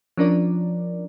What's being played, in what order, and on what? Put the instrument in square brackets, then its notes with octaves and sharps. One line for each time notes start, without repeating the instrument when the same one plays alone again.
[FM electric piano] F3 C#4 D4 A#4 D5